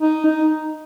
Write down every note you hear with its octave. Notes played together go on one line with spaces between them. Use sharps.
D#4
D#4